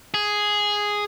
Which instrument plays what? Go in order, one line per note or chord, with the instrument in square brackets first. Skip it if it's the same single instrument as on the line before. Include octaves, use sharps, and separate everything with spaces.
[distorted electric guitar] G#4